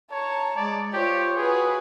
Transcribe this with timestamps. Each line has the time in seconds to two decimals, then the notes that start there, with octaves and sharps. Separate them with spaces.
0.11 C#5 A5 A#5
0.56 G#3 D5
0.93 F4 G4 C5 C#5
1.37 F#4 G#4 B4